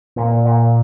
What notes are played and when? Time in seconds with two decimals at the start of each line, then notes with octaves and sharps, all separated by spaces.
0.16 A#2
0.45 A#2